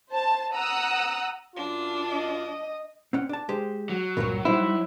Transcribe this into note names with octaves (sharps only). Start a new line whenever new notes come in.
C5 A5
F#5 A#5 D#6 E6 F#6
F#2 D4 F4
D#5
C4 C#4 F#5
D4 A5
G#3 G4 C5
F#3
C#2 G2 A#2 A#4 C#5
G3 D#4 E4 C5